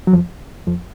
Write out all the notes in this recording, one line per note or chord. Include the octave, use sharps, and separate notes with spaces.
F#3
F2 F3
F2 F3